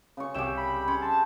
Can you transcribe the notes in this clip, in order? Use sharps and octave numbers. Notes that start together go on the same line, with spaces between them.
C#3 C#6
C2 G4 E5 G5 E7
B5
C#4 C6
A5